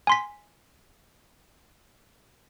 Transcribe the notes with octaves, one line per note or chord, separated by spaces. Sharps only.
G#5 C6 B6